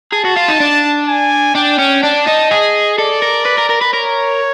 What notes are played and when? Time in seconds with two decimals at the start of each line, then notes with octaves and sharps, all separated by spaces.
0.13 G#4 A5
0.25 F#4
0.36 F4
0.48 D#4
0.60 D4
1.08 G#5
1.55 D4 G5
1.79 C#4
2.03 D4 A5
2.27 D#4
2.51 G#4 D#5
2.98 A4 D5
3.22 A#4
3.45 B4
3.58 A#4
3.70 A#4
3.82 B4
3.94 A#4 C#5